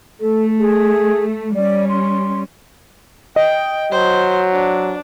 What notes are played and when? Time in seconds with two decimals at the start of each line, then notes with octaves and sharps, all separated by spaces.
0.21 A3 A4
0.59 G#4
1.55 G3 C#4 D5
1.89 C6
3.36 D#5 G5
3.92 F#3 C5
4.52 D4